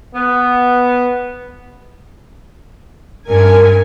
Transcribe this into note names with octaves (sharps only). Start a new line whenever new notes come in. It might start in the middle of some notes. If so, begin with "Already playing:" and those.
B3
G2 A#4 G#5